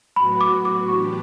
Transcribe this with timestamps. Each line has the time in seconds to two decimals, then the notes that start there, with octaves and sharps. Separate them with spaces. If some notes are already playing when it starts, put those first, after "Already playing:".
0.16 A2 F#3 B3 F#4 B5
0.41 D6
0.65 D6
0.88 A2 E3 B3 D4 G4 C#6